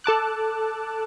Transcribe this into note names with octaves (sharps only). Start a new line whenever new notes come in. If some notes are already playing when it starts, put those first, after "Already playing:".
A4 A5 D6 F#6